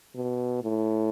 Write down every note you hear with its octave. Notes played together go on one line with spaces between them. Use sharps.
B2
A2